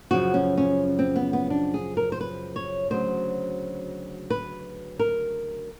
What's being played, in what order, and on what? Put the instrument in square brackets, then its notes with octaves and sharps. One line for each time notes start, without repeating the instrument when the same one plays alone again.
[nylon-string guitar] F#2 C#3 F3 F#4
C#4
C#4
C4
B3
B3
D4
G#4
A#4
C5
B4
C#5
D2 C#3 F#3 C5
B4
A#4